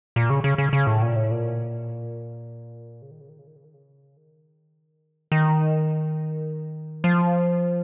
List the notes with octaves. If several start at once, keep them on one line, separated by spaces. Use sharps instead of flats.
A#2
C#3
C#3
C#3
C#3
A2
A#2
A2
A#2
C#3
D#3
C#3
D#3
C#3
D#3
C#3
D#3
C#3
D#3
D#3
F3